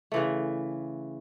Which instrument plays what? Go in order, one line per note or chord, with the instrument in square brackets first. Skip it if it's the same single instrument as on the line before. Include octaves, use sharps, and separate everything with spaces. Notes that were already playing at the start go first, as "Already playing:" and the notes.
[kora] C#3 E3 A3